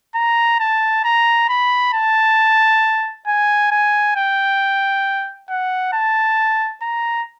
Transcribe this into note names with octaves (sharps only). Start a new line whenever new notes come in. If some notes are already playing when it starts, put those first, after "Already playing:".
A#5
A5
A#5
B5
A5
G#5
G#5
G5
F#5
A5
A#5